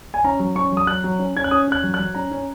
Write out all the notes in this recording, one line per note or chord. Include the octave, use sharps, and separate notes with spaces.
G#5
C#4 A#5
F#3
C#4 C#6
F#3
D#6
F#3 F#6
F#3
C#4
C#4 G#6
F#6
C#4 D#6
C#4 F#6
F#3
F#6
F#3
C#4 A#5
C#4